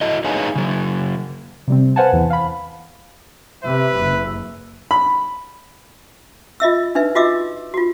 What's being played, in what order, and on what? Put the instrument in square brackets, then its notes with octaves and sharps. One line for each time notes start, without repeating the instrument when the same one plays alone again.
[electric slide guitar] E4 F#4 A4 D#5
D#4 G#4 B4 C#5 F5 G#5
C#3 F#3
[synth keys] C3 G3 C4
B4 C5 F5 F#5 G#5 A5
E2 E3
F5 B5
[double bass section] C3 [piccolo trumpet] B4 [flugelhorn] E5
[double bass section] F#1
[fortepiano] B5
[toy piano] F4 D#5 E5 E6
D4 D#4 B4 E5
F4 F#4 D#5 E5 D6 E6
F4 F#4